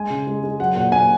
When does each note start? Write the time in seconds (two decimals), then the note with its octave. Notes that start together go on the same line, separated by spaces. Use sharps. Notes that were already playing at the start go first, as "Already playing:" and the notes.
Already playing: G#3 G#5
0.10 C#3
0.27 G#3
0.43 G#3
0.60 F#3 F#5
0.75 A#2 F#5
0.92 A#2 G#5